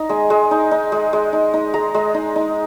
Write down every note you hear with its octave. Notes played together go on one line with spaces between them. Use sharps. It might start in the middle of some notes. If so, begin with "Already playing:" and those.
Already playing: D#4 A#5
G#3 G#5
G#3
D#4
D#4
G#3
G#3
D#4
D#4
G#3 A#5
G#3
D#4
D#4